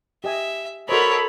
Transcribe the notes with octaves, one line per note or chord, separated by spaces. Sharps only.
G4 D#5 E5 G#5
F#4 A4 A#4 C5 C#5 D#5 B5